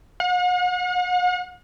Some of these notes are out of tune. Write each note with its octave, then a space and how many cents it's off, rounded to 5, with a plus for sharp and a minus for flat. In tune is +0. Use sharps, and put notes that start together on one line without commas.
F#5 -45